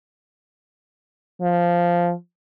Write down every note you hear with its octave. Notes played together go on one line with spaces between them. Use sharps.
F3